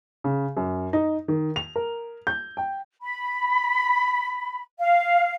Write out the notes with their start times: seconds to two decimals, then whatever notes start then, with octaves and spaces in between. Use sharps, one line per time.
0.24 C#3
0.57 F#2
0.93 D#4
1.28 D#3
1.56 F7
1.76 A#4
2.27 G6
2.57 G5
3.02 B5
4.79 F5